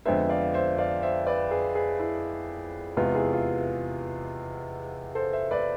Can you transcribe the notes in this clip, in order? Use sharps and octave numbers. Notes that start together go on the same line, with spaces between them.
F2 D3 G#3 B3 C5 E5
D5 F5
C5 E5
D5 F5
C5 E5
B4 D5
G#4 B4
G#4 B4
E4
E2 C3 G#3 B3 F4
E4 G#4
F4
A4 C5
C5 E5
B4 D5